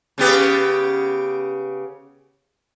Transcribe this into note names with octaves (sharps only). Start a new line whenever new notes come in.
C#3 B3 G4